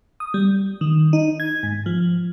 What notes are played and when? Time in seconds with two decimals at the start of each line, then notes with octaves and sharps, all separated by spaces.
0.20 D#6
0.34 G3
0.81 D#3
1.13 D#4
1.40 G#6
1.63 G#2
1.86 F3